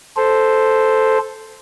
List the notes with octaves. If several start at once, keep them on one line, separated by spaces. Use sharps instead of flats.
A4 C5